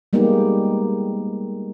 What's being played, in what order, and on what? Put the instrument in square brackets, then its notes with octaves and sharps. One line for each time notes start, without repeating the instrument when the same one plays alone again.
[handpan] G3 G#3 A#3 B3 D#4 G4